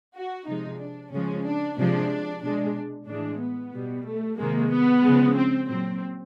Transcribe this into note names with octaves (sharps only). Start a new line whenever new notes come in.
F#4
C3 F3 G#3 D#4
D4
C#3 F3 G#3 C#4
D4
C3 F3 G#3 D4
B2 G#3 D4
A2 E3 G#3 D4
B3
B2 G3
A3
C3 D#3 G#3 A#3
B3
C#3 F3 G#3
C4
A#2 F#3 C4